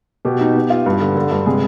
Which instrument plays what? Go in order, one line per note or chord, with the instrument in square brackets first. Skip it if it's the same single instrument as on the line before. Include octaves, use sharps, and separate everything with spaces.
[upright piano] B2 G4
D#4
B3
F4
G2
D3
D3
G2
C3 G#3 G#4